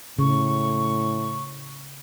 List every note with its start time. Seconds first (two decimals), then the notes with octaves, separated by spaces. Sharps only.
0.19 A2 C#3 C#6